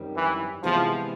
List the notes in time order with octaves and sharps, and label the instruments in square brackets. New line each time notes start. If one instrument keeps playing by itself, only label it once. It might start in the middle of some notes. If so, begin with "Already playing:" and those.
Already playing: [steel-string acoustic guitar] F#2 D#3 G3 C4
[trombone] E3
[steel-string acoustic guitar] C3 E3 G#3 B3 E4 [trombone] F3